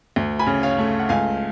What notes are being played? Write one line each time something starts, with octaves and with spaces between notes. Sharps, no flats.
D2
G#5 B5
C#3
C#5 F5
A3
F#5
C#2 F5 G#5